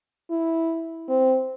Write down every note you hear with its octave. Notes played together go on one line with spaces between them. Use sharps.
E4
C4